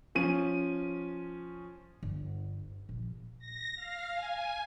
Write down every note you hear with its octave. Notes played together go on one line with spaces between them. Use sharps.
F3 C#4 D#7
G1
A#1
A#6
F5
G#5